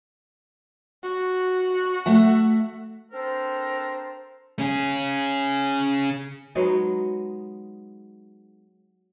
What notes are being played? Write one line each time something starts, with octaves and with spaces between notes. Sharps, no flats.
F#4
A3 E5 F#5
C4 D4 A4 A#4 C5
C#4 G#4
F#3 G#3 B3 D#4